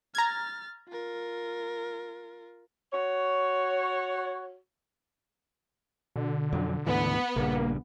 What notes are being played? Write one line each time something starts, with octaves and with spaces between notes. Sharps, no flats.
A#5 F6 G#6 A6
F4 A#4
F#4 C#5
B2 D3
F2 F#3
D2 G#2 E3 B3
A#1 G2 C#3 A#3